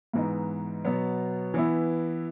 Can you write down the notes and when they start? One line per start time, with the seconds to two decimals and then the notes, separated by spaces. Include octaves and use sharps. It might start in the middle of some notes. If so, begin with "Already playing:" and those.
0.13 G#2 E3 B3 D#4
0.85 B2 F#3 B3
1.54 E3 B3 E4